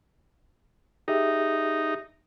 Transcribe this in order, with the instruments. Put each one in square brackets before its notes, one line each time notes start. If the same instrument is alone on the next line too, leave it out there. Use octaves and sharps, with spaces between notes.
[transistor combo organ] D#4 [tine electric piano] G4 G#4 E5